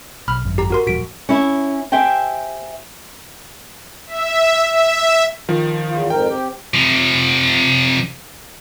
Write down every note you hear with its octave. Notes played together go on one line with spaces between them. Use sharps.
B1 B5 F6
G#1 F#2
G4 A#5
F#4 A#4 C6
D#1 A2 F3 F#4 B6 D7
C#4 E4
G4 C5 E5 G5 G#5
E5
E5
D#3 F3
E2 F4
F2 G#2 A#4 G5
C4 G4
C3 F3